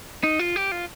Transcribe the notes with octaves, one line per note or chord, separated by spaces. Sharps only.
D#4
F4
G4
F4